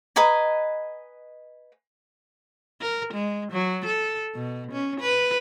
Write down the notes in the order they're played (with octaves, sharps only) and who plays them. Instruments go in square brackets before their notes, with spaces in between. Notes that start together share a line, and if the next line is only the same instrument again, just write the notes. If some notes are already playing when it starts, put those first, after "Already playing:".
[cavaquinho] B4 D#5 G#5 A#5
[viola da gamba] A#4
G#3
F#3
A4
B2
C#4
B4